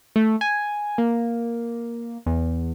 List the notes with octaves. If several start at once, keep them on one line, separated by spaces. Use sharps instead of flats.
A3
G#5
A#3
E2